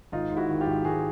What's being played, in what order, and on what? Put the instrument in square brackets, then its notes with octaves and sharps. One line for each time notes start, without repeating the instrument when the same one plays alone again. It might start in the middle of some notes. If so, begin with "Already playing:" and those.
[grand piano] G#1 D#4 F4
G#2
E4 F#4
D#3
F4 G4
G#1
G#1 F#4 G#4